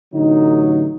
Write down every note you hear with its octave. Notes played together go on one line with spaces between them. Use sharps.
A1 D3 F#3 D#4